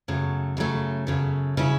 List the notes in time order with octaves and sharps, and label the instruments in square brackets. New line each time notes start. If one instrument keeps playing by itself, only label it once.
[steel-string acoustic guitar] F#2 C#3 F#3 A3
F#2 C#3 F#3 A3
F#2 C#3 F#3 A3
C#3 F#3 C#4 E4